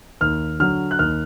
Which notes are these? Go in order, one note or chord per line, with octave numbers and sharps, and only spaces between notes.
D#2 F6
D3 F#3 F6
F#6
D#2 F6